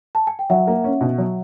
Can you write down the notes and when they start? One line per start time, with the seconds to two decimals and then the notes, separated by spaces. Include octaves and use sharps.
0.15 A5
0.27 G#5
0.39 G5
0.50 F#3 E5 F#5
0.67 A#3
0.84 C#4
1.01 B2
1.18 F#3